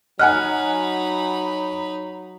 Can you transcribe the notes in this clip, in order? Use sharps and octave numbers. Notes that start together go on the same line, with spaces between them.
F#3 D#4 D#5 F#5 G#5 B5 F6 F#6